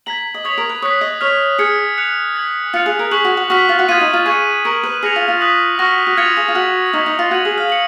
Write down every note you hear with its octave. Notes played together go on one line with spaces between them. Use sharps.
A#5 G#6 B6 F#7
D#5
C#5 D#6 G#6 B6 F7
A#4
B4
C#5 D#6 F#6 B6
D#5
C#5 F6 B6 F7
G#4 F6 G#6 C#7
F#6 C#7 F7
G#6 B6 F#7
F4 F#6 C#7 F7
G#4
A#4
G#4 C#6 F#6 B6 F#7
F#4
F#4
F#4 C#6 F6 B6
F4
F#4
F4 D#6 G#6 B6 D#7
D#4
F4
G#4 C#6 G#6 C#7
A#4 C#6 G#6 C#7 F#7
B4
G#4 F6 A#6 C#7 F7
F4
F4
D#6 F#6 B6 F#7
F#4 C#6 F6 A#6
F#4
F4 F6 G#6 C#7 F7
G#4
F4
F#4 F6 B6 F#7
D#4 C#6 F6 G#6 B6
D#4
F4
F#4 G#6 D#7 F#7
G#4
F5
C#7 F#7